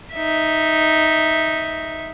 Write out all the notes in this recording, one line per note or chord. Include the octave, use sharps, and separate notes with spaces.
D#4 E5